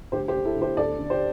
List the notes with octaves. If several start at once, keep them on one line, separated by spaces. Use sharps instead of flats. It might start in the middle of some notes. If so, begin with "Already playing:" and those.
D2 G4 C5
G4 C5
D3
E4 A4
D2
G4 C5
D2 A4 D5
D3
G4 C5